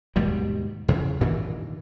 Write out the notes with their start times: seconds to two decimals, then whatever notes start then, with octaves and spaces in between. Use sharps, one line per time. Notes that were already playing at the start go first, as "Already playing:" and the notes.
0.16 D#2 G#2 B2 G3
0.88 E2 C#3
1.21 G2 A#2 D#3 E3